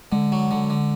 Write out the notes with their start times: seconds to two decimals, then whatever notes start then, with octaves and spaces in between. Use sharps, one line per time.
0.12 D3 G#3
0.32 F#3
0.51 D3
0.70 D3